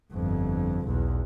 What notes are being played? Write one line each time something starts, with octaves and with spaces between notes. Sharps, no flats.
G1 F2
B1 E2